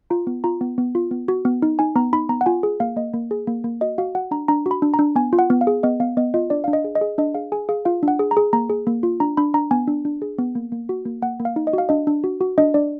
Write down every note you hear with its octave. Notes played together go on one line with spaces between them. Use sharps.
F4 A#5
B3
F4 A#5
B3
B3
F4
B3
F#4
B3
D#4
D#4 G#5
B3 A#5
D#4 B5
B3 A#5
F#5
F4 G#5
G#4
A#3 F5
A#3 D#5
A#3
G#4
A#3
A#3
F#4 D#5
F#4 F5
F#4 F#5
D4 A#5
D4 A#5
F#4
B5
D4
A#5
D4
B3 G#5
F4
F#5
B3
F5
G#4
B3 D#5
B3 F5
B3 D#5
F4 D#5
D4 D5
D4 F5
D#5
G#4
D#5
G#4
D4 D#5
G#4 F5
G#4 G#5
G#4 F5
F4 F5
D4
F#5
G#4
A#5
G#4
A#3 A#5
G#4
A#3
F4
D4 A#5
D4 B5
D4 A#5
B3 G#5
D4
D4
G#4
B3
A#3
A#3
F#4
A#3
A#3 F#5
A#3
F5
D#4
D#5
F#4 F5
D4 D#5
D4
F#4
F#4
D4 D#5
D4 D5